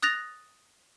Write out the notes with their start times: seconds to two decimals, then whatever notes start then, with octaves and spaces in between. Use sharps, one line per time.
0.02 D#6 F#6 A6 A#6 F7